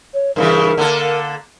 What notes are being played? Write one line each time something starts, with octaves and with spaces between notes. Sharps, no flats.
C#5
G2 C#3 E3 A#4
D3 A#3 A4